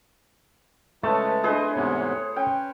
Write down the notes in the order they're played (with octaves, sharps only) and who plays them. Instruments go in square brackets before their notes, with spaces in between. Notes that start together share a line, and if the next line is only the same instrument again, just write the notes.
[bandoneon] C#3 G#3 [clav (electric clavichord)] A3 [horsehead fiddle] B4 C#5 [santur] A5
[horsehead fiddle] D4 D#5 [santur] G#4 B4 C5
[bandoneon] E2 G#2 C3 [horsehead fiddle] C#5
[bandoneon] C#4 [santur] G5